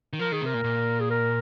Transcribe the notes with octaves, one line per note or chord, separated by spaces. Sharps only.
D#3
F3 A#4
D#3 G#4
C3 A#4
A#2
A#2
G#4
A#4